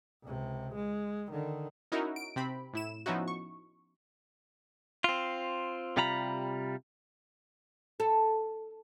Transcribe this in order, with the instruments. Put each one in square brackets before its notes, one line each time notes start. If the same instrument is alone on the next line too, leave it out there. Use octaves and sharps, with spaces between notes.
[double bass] C#2 C3
G#3
D3 D#3
[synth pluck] C#4 D#4 E4 F#4 A#4
D7
C3 C4 B5
A2 E4 E7
F3 B3 C#4 D#4 E4 F#4
C#6
[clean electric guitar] C4 F4
C3 G3 F4 A#5 B5
[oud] A4